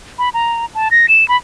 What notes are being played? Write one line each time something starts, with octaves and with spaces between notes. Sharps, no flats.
B5
A#5
A5
A#6
E7
B5